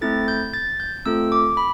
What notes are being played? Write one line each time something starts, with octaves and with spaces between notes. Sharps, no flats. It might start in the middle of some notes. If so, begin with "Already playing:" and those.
A3 C4 E4 A4 A6
G6
A6
G6
A3 C4 F4 A4 E6
D6
B5